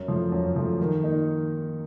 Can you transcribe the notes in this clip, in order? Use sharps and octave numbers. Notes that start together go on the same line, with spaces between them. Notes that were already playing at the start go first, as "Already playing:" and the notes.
Already playing: F#2
F3 A3
F#2
F3 A3
D#3
A#3 D#4